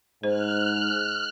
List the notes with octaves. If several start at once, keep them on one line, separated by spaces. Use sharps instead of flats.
G#2 C5 F6 F#6